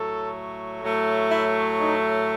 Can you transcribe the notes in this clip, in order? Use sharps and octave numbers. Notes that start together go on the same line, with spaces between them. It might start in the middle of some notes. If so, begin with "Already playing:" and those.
Already playing: A2 F#3 A3 A4
A2 F#3 A3
E4
D#4